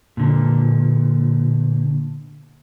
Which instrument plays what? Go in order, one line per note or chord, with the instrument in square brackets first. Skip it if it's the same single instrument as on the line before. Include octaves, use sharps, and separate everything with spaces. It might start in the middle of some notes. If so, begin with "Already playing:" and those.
[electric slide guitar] A#2 D3